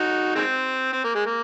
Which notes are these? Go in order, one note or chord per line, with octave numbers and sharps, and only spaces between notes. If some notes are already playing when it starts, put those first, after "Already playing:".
Already playing: D#4 F#4
D#3 G#3 C4
C4
A#3
G#3
A#3